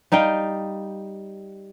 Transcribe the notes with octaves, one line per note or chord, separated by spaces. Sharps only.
G3 D#4 F5 G5